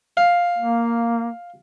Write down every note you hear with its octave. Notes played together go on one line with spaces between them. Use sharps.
F5
A#3